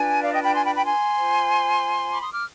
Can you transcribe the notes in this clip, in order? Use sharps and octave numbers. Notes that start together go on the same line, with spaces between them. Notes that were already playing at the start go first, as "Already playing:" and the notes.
Already playing: D4 F4 B4 G#5
D5 F5
D#5 G5
G5 B5
G#5 C6
G5 B5
G5 B5
G#5 C6
F4 C5
B5 D6
C6 D#6
D6 F6